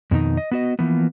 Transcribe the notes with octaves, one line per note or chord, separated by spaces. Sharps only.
F2 B2 D#3 D#4
D#5
B3 F#4 D#5
E3 F3 A#3 B3